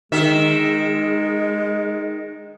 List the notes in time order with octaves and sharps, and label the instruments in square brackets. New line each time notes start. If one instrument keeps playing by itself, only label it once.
[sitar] D#3 E5 [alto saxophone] G#3